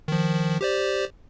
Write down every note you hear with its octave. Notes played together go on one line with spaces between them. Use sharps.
D#3 F3
G4 C5 D5